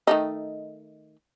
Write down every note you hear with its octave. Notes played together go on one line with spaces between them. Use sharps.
D#3 A3 D#4